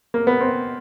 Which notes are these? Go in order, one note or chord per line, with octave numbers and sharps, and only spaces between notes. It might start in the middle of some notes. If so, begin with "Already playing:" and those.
A#3
B3
C4